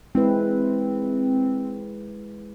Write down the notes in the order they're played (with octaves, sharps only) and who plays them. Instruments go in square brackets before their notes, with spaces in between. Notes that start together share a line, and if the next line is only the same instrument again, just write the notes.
[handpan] G#3 E4 B4 [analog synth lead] C4